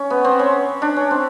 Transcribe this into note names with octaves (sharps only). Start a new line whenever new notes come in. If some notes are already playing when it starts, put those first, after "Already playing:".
Already playing: C#4
B3
C4
C#4
D4
C#4
C4